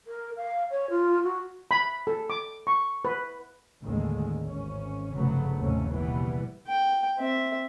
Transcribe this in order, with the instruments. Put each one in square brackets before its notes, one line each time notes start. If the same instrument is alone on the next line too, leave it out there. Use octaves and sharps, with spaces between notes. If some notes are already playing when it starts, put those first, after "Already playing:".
[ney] A#4
F5
C#5
F4
F#4
[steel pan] B5
A4
D6
C#6
B4
[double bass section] A1 D#2 D3 D#3 G#3
G#1 C#4
F1 G2 C#3 F#3 A3 B3
G#1 D#2 A2 C3 A3 C#4
F#1 B2 E3 G3 B3
[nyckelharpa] G5
C4 E5